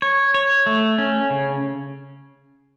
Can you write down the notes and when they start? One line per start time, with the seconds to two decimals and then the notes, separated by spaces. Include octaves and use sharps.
0.02 C#5
0.34 C#5
0.66 A3
0.98 C#4
1.30 C#3